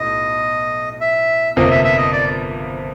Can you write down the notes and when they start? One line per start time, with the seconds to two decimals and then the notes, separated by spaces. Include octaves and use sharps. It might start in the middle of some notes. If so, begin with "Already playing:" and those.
Already playing: B1 A2 D#5
1.00 E5
1.56 G1 F2 C3 F3 A#3 D#5
1.71 E5
1.84 E5
1.98 D#5
2.12 D5